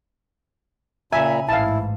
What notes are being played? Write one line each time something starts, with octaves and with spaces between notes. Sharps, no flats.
A#2 C#3 E5 G#5 A#5 B5
A1 G#2 E4 F5 A5